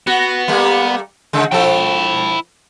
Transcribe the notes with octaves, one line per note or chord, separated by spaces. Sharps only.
B3 F#4
G3 A3 A#3
C#3 G#3
F3 E4 A4 G5